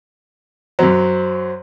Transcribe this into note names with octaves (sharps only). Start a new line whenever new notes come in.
F#2 F#3 C5